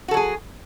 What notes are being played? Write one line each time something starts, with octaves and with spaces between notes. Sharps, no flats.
F#3 F#4 G#4 A4